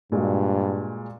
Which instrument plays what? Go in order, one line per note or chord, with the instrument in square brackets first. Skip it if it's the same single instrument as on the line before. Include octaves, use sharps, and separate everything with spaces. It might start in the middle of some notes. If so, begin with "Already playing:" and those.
[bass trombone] G2 [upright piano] A#2 G#3 F#4